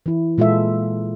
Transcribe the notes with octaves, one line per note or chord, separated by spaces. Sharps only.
E3 E4
A#2 G#3 F4 A4 E5